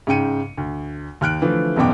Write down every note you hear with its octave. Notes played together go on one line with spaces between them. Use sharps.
G#2 C#3 G5 C#7 D#7
D2
D#2 F6 F#6 D7
D3 E3 F3 A3
E1 B1 F#2 B2 G5 D6